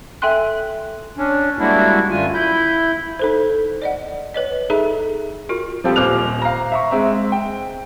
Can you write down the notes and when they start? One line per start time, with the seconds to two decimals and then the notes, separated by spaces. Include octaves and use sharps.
0.22 A4 E5 G5 G#5 C6 F#6
1.18 C#4 D4
1.59 G3 G#3 A#3 D4 E4 F#4
2.10 F#2 D3 A3 F4 G#5
2.34 E4 B5 G6
3.19 D#4 A4 C5
3.82 D5 D#5 F#5
4.34 B4 C#5 D#5
4.70 D#4 G#4 A4 E5 A#5
5.49 F4 F#4 A#4
5.84 F3 G3 C4 F4 G4 A4
5.96 D#1 C5 D6 F6 F#6 F7
6.42 F5 A#5
6.72 E5 A#5 C#6
6.91 G#3 C4 E5
7.32 G5